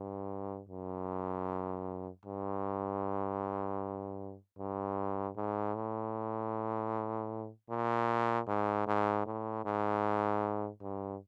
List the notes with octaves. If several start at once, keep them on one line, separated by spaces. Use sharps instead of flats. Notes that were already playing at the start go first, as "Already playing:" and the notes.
Already playing: G2
F#2
G2
G2
G#2
A2
A#2
G#2
G#2
A2
G#2
G2